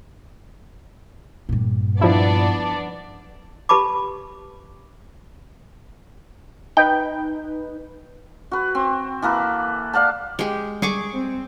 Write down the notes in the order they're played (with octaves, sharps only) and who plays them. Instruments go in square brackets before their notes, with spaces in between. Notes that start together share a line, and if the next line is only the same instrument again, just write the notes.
[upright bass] G2 A#2
[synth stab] F3 E4 [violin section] B3 D4 D5
[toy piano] G4 B4 A5 B5 D6
[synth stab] D#4 B4 [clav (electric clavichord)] G5
[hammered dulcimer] F#4 B4
C4
E3 A#3 A4 B4
D5 F5 F#5 A5
[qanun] G#3 G4
[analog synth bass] G3 [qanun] G#4 C#6 D6
[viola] C4